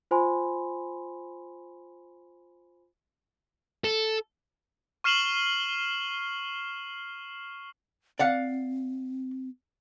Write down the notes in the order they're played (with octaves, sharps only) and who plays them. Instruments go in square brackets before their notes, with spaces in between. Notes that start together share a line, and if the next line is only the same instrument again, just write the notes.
[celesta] F4 C5 G#5 B5 C6
[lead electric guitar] A4
[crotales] C#6 F6 C7 E7 F#7 G7
[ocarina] C4 [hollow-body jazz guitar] D5 F5 F#5